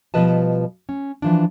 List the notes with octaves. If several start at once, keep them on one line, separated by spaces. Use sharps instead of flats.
B2 F3 G3 B4 D#5 A5
C#4
E3 F3 D4